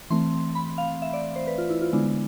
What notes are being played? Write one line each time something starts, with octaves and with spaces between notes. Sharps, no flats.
E3 A3 C4 C6
B5
F5
E5
D5
C5
B4
F4
E4
F4
D3 G#3 B3 D4 E4